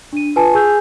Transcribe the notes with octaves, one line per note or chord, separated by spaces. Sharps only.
D4 D#7
F4 B4 G#5 A5
G#4 G#5 E6 G6